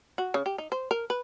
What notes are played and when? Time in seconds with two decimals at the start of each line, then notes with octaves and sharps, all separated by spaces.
0.18 F#4
0.34 C#3
0.46 G4
0.58 D#4
0.72 C5
0.91 A#4
1.10 B4